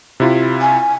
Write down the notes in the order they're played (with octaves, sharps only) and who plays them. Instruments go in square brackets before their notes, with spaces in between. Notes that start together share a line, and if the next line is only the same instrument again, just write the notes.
[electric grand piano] C3 E4 F4
[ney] G#5